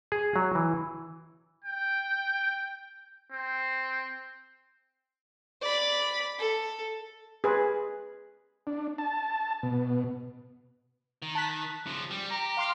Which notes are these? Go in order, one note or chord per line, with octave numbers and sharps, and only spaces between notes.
G#4
F#3
E3
G5
C4
D5 B5
A4
G#4 B4
D4
A5
B2
D#3
A5 F#6 B6
C#3 F3
G3
G4 A#5
F5 C6 F6